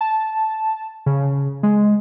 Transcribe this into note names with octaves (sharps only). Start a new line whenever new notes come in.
A5
C#3
G#3